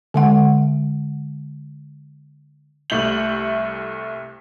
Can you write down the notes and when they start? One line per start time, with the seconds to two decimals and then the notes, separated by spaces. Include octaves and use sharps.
0.14 D3 G#3 F#5
2.90 C2 A3 G6 F#7